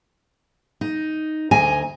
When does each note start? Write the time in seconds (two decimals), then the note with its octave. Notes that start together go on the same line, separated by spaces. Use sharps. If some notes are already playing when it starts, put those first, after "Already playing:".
0.81 D#4
1.51 D2 D#5 G#5 A#5